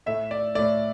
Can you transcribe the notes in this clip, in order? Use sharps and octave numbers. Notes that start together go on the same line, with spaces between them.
A2 A3 E5
D5
A2 A3 D5